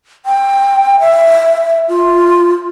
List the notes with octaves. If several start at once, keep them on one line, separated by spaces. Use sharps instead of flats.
G5
E5
F4